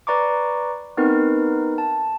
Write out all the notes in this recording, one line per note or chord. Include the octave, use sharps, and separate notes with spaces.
B4 D5 A#5 C#6 D6
B3 C4 D#4 A#4 B4
A5